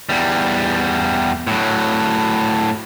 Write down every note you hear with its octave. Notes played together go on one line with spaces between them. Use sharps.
E2 G3
A2 F#3